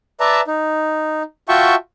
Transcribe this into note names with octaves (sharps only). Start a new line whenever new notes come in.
B4 D5 E5 A5 A#5
D#4
F4 F#4 E5 G5 A5 C#6